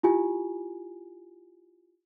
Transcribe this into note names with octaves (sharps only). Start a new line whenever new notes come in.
E4 F4 G4 G#5